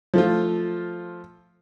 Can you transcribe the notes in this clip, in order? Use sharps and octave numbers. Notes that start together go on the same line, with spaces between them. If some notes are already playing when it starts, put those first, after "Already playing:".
F3 A3 F4